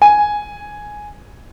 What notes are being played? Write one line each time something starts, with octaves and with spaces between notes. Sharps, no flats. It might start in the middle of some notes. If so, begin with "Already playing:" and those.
G#5